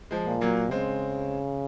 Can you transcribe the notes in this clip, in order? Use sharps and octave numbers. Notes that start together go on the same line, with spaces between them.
F3 G#3
A#2
F#3 A#3
C#3 G#3 C4